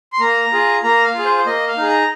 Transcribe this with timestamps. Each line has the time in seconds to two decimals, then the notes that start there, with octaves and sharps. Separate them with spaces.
0.12 C6
0.20 A#3 A#5
0.52 F4 G#4
0.83 A#3 A#5
1.04 F5
1.14 F4 G#4
1.25 C5
1.37 C5
1.46 A#3 D#5
1.68 F5
1.77 D#4 G#4
1.89 A#5